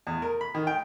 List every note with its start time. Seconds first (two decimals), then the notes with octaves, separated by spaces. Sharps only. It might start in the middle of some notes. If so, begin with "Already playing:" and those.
0.07 E2
0.22 A#4
0.41 B5
0.55 D#3
0.67 G5